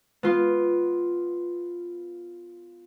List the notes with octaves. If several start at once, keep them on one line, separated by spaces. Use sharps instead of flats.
B3 F4